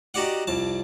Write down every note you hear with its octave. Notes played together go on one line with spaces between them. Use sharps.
D#4 F#4 G4 D5 F#5
C2 F2 A5